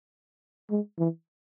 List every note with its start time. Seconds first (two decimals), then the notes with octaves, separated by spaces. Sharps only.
0.71 G#3
0.99 E3